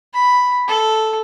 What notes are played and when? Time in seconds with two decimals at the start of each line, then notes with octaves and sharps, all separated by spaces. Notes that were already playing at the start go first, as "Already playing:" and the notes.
0.14 B5
0.68 A4